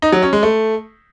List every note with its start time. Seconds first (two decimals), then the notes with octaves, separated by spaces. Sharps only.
0.02 D#4
0.12 F#3
0.23 C#4
0.33 G#3
0.43 A3